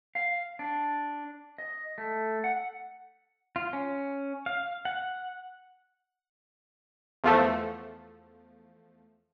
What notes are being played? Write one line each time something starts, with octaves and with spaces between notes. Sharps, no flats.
F5
D4
D#5
A3
F#5
F4
C#4
F5
F#5
E2 F3 A3